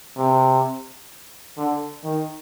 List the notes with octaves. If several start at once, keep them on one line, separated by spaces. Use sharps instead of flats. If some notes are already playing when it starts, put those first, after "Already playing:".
C3
D3
D#3